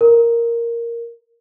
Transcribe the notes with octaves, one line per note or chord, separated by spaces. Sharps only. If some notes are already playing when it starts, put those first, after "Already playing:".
A#4